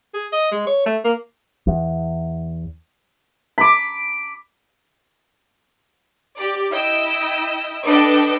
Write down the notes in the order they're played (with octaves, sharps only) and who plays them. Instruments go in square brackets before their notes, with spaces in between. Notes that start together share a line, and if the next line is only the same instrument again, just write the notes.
[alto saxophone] G#4
D#5
G#3
C#5
A3
A#3
[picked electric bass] E2
[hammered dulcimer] B5 D6
[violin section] G4 D5
E4 D#5 G5 E6
D4 A4 B4 D5 D#5 G5